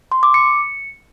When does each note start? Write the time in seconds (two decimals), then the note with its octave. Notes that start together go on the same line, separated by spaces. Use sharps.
0.12 C6
0.23 D6
0.34 C#7